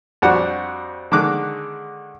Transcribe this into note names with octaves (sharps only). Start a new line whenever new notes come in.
F2 G3 D4 F#4 F#5
D3 D#3 G#3 D6 F#6